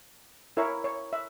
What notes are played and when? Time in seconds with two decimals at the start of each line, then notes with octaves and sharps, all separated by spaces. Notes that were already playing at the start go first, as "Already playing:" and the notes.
0.57 E4 A#4 C#5 E5
0.84 C#5
1.13 E5